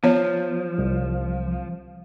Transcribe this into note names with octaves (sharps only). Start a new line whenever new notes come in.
F3 B3 C#5
C2